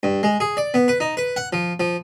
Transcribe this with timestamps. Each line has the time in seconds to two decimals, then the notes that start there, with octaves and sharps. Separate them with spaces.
0.03 G2
0.23 G#3
0.40 G#4
0.57 D5
0.74 B3
0.88 B4
1.00 D#4
1.17 B4
1.36 F#5
1.53 F3
1.80 F3